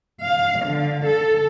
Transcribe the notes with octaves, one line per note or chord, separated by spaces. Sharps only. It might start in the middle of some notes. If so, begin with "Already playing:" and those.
F5
D3
A4